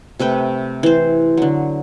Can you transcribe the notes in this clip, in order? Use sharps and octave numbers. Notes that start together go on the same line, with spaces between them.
C3 A3 B4 G5
E3 C5
D3 F#3